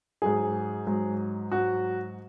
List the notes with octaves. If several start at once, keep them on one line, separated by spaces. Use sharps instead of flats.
G#2 F#3 G#4
G#2 F#3
G#2 F#3 F#4